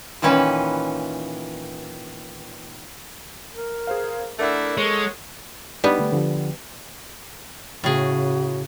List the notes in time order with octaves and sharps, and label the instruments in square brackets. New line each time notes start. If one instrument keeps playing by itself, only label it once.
[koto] A#2 D#3 E3 C#4 B4
[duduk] A#4
[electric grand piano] G#4 C5 F5
[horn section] A3 D4 E4 [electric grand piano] A#4 F#5
[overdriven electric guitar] G#3 [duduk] A4 [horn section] C#5
[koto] G3 B3 [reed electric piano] D4 D#4 G4
[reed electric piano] D3 A3
D3 F3 G4
[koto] A2 G#4 [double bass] C#3 [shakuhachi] F#4